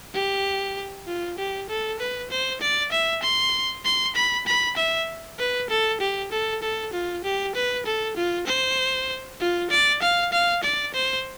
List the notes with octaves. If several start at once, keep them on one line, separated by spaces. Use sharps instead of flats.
G4
F4
G4
A4
B4
C5
D5
E5
C6
C6
B5
B5
E5
B4
A4
G4
A4
A4
F4
G4
B4
A4
F4
C5
F4
D5
F5
F5
D5
C5